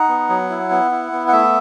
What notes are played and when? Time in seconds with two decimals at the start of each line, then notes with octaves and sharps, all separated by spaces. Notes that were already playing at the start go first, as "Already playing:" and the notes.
Already playing: D#4 F#5
0.08 B3
0.29 F#3
0.50 E4
0.71 B3
0.91 E4
1.12 B3
1.28 F#5
1.33 A3 E5